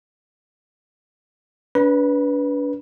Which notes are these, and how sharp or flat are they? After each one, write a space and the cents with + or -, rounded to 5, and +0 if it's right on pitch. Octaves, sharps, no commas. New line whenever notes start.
D4 -35 B4 -10 B5 -40